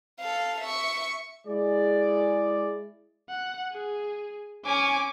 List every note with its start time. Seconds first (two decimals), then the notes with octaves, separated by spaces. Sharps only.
0.20 A4 F5
0.60 E5 C#6
1.47 G#3 E4 G#4 D5
3.29 F#5
3.72 G#4
4.65 C#4 G#5 D6